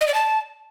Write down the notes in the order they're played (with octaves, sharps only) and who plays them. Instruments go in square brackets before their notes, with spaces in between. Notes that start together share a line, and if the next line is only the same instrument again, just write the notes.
[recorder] D#5
D5
A5